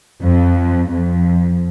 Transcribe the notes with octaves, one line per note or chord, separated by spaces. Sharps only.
F2
F2